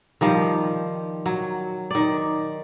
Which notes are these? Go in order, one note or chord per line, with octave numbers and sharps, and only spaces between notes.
D#3 F3 G3
F#3
D#3 D5